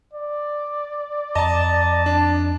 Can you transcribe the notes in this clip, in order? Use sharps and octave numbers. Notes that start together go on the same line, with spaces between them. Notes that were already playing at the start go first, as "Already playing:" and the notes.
D5
F2 D#5 A5 A#5
D4